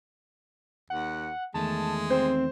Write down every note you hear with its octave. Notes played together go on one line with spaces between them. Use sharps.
D#2 F#5
E2 D#3 G#3 A3 A5
C4 C5